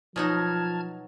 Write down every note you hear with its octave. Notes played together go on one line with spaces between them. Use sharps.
B2 F3 F#3 D#4 A5 F6 G#6